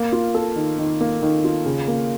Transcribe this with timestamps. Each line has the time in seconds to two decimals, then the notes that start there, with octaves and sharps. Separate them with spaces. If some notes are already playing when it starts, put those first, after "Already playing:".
Already playing: A#3
0.12 F4
0.35 A4
0.56 D#3
0.79 D#3
1.01 A#3
1.22 D#3
1.44 F4
1.65 C#3
1.88 A#3